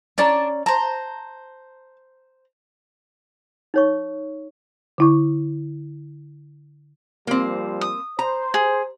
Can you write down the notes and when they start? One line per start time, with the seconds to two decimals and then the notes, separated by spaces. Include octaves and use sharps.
0.18 C#4 D4 D5 A5 A#5
0.66 C5 A5 A#5
3.74 D#4 C#5 C#6
4.98 D3 E4 C#6
7.27 F3 G3 A#3 C4
7.81 D#6
8.19 C5 A#5
8.54 G#4